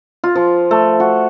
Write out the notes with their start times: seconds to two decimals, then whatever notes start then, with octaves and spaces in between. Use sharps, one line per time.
0.24 F4
0.35 F3
0.71 A3
1.00 F#4